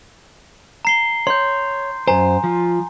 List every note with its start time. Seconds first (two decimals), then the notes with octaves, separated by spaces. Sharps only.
0.85 A#5 C7 G7
1.27 C#5 C6 G6
2.07 F#2 C5 G#5 A#5
2.44 F3